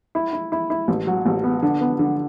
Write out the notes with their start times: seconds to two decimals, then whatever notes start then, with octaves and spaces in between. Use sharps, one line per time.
0.15 E4
0.33 E4
0.52 E4
0.70 E4
0.88 A1
1.07 F#3
1.26 A1
1.44 B3
1.63 D3
1.81 B3
1.99 D3